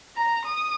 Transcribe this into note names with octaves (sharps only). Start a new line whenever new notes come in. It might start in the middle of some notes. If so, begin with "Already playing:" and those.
A#5
D#6